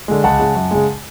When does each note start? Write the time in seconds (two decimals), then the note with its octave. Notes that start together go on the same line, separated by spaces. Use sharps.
0.08 D3 G#3
0.24 C#2 F#5 A5
0.39 C#3 G#3
0.55 F#2
0.71 C#3 G#3